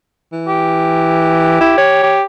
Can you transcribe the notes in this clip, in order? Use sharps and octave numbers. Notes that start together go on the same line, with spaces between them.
E3
G4
E4
C#5
G4